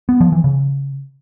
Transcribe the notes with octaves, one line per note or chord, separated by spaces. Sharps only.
B3
F3
E3
C#3